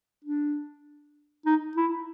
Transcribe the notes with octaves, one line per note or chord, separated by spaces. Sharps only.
D4
D#4
E4